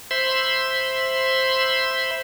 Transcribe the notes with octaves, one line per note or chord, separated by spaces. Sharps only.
C5 E5 B5 C6